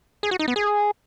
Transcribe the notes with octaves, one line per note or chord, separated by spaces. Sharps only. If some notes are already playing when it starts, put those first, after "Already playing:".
G#4
F#4
D#4
B3
G#4